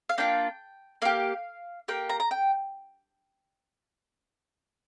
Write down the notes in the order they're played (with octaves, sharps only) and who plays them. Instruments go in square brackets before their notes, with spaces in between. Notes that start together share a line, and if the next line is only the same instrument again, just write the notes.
[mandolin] F5
A#3 D4 F4 G5
A#3 G4 F5
A#3 G4 G5
A#5
A#5
G5